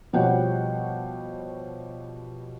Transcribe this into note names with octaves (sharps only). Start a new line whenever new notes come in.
B2 F3 G3 C#5 F#5 G5